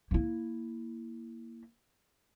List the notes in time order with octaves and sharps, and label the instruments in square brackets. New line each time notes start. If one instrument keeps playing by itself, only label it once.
[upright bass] A#3 E4